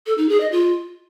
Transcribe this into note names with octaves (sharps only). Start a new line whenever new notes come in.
A4
D#4
G#4
D#5
F4